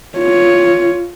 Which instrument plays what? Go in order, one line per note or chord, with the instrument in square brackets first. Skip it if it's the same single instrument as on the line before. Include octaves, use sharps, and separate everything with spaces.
[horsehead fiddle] F4 C#5